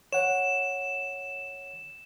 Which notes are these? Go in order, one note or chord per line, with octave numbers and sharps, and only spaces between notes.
C#5 F#5 E7